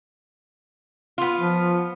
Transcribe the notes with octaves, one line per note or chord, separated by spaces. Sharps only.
B3 F4
F3